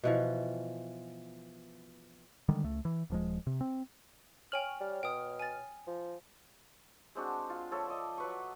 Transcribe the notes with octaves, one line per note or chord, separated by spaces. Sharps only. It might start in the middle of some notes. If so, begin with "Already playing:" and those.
B2 E3 F3
D3 D#3 G3 G#3
C#2 A3
E3
D#1 F3 G#3
C3
C4
C#5 G5 G#5 F6 F#7
G3
B2 G5 D#6
G#5 A6
F3
G#3 C4 D4 F#4
F4
F3 A4 C#5 E5
D5 D#5
F#3 B4 C#6